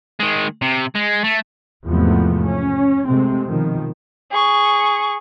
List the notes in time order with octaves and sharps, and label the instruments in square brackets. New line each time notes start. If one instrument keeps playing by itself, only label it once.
[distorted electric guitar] D#3 G#3
C3
G#3
A3
[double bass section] E2 G#2 C3 F3 A3 B3
C#4
C3 G#3 A3 C4
B2 D#3 F3
[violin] G#4 C#6